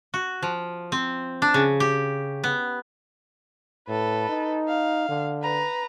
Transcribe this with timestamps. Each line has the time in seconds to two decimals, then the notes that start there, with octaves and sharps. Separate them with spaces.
0.14 F#4
0.43 F3
0.92 C4
1.42 D4
1.54 C#3
1.80 G4
2.44 B3
3.88 A2 A4 B4
4.29 D#4
4.69 F5
5.09 D3
5.43 B4 A#5